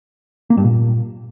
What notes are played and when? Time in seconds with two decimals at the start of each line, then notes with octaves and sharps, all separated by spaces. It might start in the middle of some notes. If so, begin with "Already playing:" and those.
0.50 A#3
0.57 G2
0.64 A#2